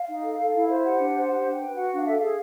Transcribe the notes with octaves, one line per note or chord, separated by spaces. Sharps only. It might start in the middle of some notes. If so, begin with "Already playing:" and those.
Already playing: F5
D#4
A4
A4
E4
C5
G4 F#5
D4
C5
G4 F#5
D4
G5
B4
F#4 F#5
D4
F5
A4 E5
F5
G#4